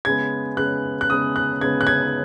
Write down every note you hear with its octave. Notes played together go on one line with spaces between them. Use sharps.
C#3 G#3 B3 G#6
C#3 G#3 B3 F#6
F#6
C#3 G#3 B3 D#6
F#6
C#3 G#3 B3 G#6
F#6
G#6